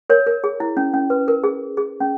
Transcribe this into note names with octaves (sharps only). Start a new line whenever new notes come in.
A#4 C#5
A#4
G#4
E4
C#4
C#4
B4
A#4
G#4
G#4
C#4